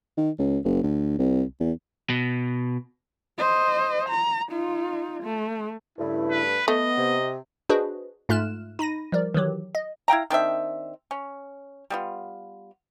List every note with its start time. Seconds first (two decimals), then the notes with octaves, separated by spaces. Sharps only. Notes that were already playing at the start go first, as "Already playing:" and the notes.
0.17 D#3
0.39 C#2
0.65 F#1
0.83 D2
1.19 C2
1.60 E2
2.10 B2
3.38 C5 D#5
4.09 A#5
4.50 D#4 F4
5.23 A3
5.98 G2 C#3 A3 E4
6.31 B4
6.68 A3 B3 D#5
6.97 C3
7.69 D4 F#4 G#4 B4 C5 D#5
8.29 G#2 A3 F4 F6 F#6 E7
8.79 D#4 B5 A#6 D#7
9.12 F3 G3 A#4 D5
9.34 D#3 E3 F#3 G4
9.75 D#5
10.08 E4 F5 G5 A#5
10.30 D#3 C4 D4 E5
11.11 C#4
11.90 G3 B3 F4